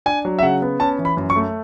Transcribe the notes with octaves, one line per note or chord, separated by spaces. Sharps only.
D4 G#5
F#3
E5
C#3 F#5
B3
C#4 A5
E3
B5
F#2
C#6
A3